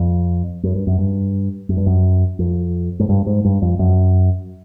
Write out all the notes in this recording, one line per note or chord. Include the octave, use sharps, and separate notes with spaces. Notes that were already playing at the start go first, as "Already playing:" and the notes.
Already playing: F2
F#2
G2
F#2
G2
F#2
G2
F#2
F2
G#2
G2
G#2
G2
F2
F#2